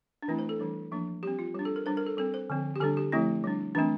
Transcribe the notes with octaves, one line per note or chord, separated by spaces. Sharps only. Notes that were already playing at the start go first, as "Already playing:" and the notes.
D4
E3 A3 C4 E4
C5
A4
E3 G3 D4
F3 A#3 D4
G3 C4 G4
F4
G3 D4 G4
A4
A#4
G3 D4 C5
A#4
A4
G3 C4 A4
C5
D3 F3 C4
G4
D3 G3 D4 A4
G4
F3 A3 C4 E4
G3 D4
E3 A3 C4 D4